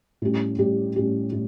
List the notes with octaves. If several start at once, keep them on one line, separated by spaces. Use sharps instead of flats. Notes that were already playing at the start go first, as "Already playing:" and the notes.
A2 G3 C#4 G4
A2 G3 C#4 G4
A2 G3 C#4 G4
A2 G3